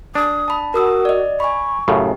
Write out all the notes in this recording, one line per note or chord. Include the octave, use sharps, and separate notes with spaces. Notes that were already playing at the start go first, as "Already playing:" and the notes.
D4 D#6
A5 B5
F#4 A#4 D#6 E6
D5 D#5
G#5 B5 C#6
F#2 A2 C#3 G4